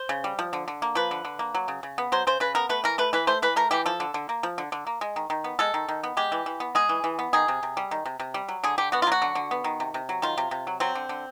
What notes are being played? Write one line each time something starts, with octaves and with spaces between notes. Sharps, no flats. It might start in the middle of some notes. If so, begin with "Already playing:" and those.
Already playing: C5
C#3
G3
F3
D3
D3
A#3
F3 B4
D3
D3
A#3
F#3
C#3
C#3
B3
F#3 C5
C#3 C5
C#3 B4
B3 A#4
A3 B4
E3 A#4
A3 B4
E3 B4
A3 C5
E3 B4
A3 A#4
E3 G4
F3 A4
D3
D3
A#3
F3
D3
D3
A#3
G#3
D#3
D#3
B3
G#3 A4
D#3
D#3
B3
G#3 G4
E3
E3
B3
G#3 G#4
E3
E3
B3
D#3 G#4
C3
C3
G3
D#3
C3
C3
G3
F#3
D3 G#4
D3 G4
B3 F#4
F4
F#3 F#4
D3
D3
B3
D#3
C3
C3
F#3
D#3 F4
C3
C3
F#3
F#3 C4
D3
D3